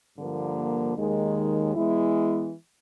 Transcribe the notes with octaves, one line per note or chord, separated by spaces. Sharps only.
G2 D3 F3 A#3
D#2 D#3 G#3
E3 G#3 B3 E4